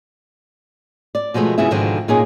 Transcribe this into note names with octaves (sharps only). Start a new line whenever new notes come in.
D5
B2 F3 G#3 A3 B3
C#3 F#3 B3 E4 G#4 E5
G#2 B2 D3 D#3 F3 D#4
A#2 A#3 C#4 D#4 F4 G#4